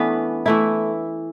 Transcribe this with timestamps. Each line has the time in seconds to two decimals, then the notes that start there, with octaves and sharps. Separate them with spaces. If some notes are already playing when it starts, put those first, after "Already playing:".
Already playing: E3 A3 B3 C#4 D4 B4
0.46 E3 A3 E4